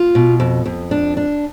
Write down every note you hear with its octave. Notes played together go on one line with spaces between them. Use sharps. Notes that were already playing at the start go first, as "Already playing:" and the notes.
Already playing: F4
B2
F2
F2
D4
D4